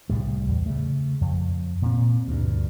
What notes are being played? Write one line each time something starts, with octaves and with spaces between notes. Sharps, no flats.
C2 A2 G3
E2
C#3 A3
F2
A#2 C4
D2 G2